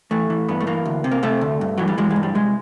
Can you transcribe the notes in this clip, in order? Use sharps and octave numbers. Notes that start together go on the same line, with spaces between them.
E3 A3
E3
G2 B3
A3
E3 A#3
D2
C3
A#3
C3 A3
D2
G2
E3 F#3
G3
E3 G#3
G#3
G2
G3
C2 G#3